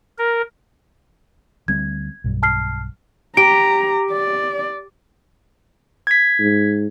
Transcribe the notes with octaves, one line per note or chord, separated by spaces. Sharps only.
A#4
D2 G3 C4 G#6
B1 G2
A5 F6 C7
G4 A#5 D7
D5
G#6 B6
G#2